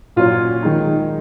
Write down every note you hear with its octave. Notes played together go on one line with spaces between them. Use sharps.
A#2 F#3 C#4 F4
D#3 G#3 D#4